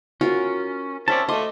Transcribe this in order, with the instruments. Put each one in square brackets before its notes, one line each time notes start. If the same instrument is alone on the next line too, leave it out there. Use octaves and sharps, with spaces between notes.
[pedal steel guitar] C#4 [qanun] F4 F#4 A#4
[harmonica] C4 C#4 [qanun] A4 [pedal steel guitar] D5 E5 A5
[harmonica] A3 [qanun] D#5 [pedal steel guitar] F5 C6 D6